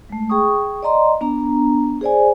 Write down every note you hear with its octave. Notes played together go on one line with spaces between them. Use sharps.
G#3 A3
G#4 G5 C#6 D#6
D5 D#5 A#5 C6
B3 D4 A#5
G#4 C5 D5 G#5